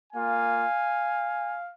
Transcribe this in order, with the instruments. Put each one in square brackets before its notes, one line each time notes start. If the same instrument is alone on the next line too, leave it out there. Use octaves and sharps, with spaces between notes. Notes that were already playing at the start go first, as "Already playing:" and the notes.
[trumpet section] A#3 F4 F5 G#5